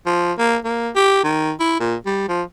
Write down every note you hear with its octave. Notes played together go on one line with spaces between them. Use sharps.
F3
A#3
A#3
G4
D#3
E4
A#2
G3
F3